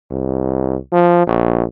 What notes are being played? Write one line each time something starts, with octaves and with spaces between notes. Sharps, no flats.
C2
F3
A#1